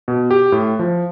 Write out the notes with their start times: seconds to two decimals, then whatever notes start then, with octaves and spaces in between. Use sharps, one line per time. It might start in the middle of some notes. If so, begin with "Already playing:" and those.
0.08 B2
0.31 G4
0.52 A2
0.79 F3